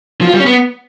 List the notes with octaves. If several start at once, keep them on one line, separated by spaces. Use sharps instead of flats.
F3
F4
G3
C#4
B3